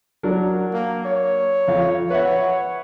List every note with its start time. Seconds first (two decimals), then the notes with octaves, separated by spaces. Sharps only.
0.23 F#3 D4 A#4
0.73 A#3
1.05 C#5
1.67 F2 F5
2.10 B4 C#5 E5 F#5